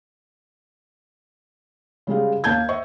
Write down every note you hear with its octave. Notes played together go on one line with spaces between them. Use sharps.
C#3 G3 G#3 F5
D#2 A#3 A5 G6 G#6
C5 D#5 E5 C#6